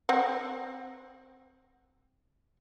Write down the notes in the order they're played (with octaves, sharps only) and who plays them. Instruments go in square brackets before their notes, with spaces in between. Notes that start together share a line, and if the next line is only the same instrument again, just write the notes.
[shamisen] C4 F#5